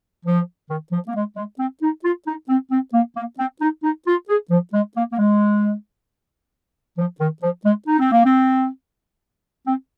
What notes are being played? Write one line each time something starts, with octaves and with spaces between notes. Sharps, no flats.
F3
D#3
F3
A#3
G#3
G#3
C4
D#4
F4
D#4
C4
C4
A#3
A#3
C4
D#4
D#4
F4
G#4
F3
G#3
A#3
A#3
G#3
F3
D#3
F3
G#3
D#4
C4
A#3
C4
C4